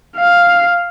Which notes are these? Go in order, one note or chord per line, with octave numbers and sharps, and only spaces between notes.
F5